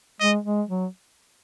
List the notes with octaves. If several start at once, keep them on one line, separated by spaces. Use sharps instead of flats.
G#3 D#5
G#3
F#3